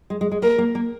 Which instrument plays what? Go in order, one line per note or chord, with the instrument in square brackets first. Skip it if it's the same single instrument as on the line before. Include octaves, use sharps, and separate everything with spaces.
[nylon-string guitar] G#3
G#3
G#3
[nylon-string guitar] A#3 [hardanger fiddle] A#4
[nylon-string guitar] A#3
A#3